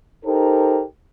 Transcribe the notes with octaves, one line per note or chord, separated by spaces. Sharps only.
D#4 G4 A4 A#4 C5